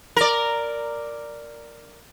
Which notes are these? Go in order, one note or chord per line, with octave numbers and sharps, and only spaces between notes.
A#4 D5